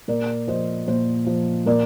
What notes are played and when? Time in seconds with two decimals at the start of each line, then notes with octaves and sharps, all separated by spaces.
0.08 A#2 A#4 D5
0.47 F3 C5 D#5
0.88 A#2 C5
1.27 F3
1.66 A#2 A#4 D5